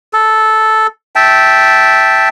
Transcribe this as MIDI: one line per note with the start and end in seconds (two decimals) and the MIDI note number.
0.13 0.87 69
1.16 2.29 76
1.16 2.29 79
1.16 2.29 81